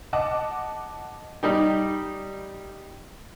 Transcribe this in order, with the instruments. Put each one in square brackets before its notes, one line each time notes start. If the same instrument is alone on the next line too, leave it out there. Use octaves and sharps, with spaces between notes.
[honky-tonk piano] D#5 F#5 A5 D6
[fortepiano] G3 D#4 G4